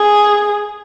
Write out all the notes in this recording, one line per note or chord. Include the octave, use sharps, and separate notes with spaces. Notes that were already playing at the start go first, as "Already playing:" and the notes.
Already playing: G#4